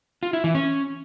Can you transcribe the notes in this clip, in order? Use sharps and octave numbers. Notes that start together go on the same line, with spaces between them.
F4
E4
E3
C#4